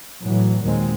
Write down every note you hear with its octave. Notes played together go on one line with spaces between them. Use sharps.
A2 E3 F#3
D#2 A#2 D#3 F#3 G#3 C4